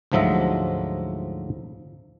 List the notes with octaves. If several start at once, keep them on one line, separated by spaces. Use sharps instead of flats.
D2 G#2 F3 F#3 D#5 E5